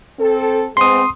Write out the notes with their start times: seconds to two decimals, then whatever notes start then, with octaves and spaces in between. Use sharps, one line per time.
0.19 C4 A4
0.77 G#3 B3 C4 C6 D#6